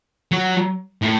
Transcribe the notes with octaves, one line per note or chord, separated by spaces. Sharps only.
F#3
A2